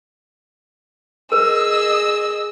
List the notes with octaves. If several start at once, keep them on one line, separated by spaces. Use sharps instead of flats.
G#4 A#4 B4 D#5 E6